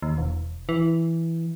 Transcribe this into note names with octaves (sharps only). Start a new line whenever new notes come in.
D#2
E1
E3